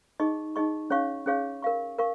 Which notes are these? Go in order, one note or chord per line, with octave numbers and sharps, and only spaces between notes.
D#4 G#4 D#5 C#6
D#4 G#4 D#5 C#6
C#4 G#4 C#5 F5 C#6
C#4 G#4 C#5 F5 C#6
A#4 F5 C#6
A#4 F5 C#6